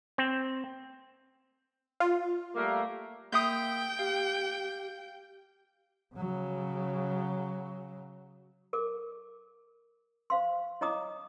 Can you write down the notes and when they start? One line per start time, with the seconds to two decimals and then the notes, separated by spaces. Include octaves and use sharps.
0.18 C4
2.00 F4
2.55 G3 A3 A#3
3.32 A#3 E5 G5 D#6 G6 C7
3.99 G4 F5
6.15 C#3 F#3
8.73 A4 A#4 D6
10.30 C5 F5 C6
10.81 E4 C#5 D#5 A#5 D6 D#6